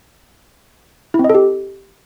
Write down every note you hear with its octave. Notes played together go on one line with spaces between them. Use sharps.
E4
C4
D#5
A4
G4